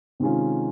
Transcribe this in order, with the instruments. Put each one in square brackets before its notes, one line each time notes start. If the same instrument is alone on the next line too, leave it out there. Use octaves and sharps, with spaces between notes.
[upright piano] C3 D#3 G#3 C#4 F4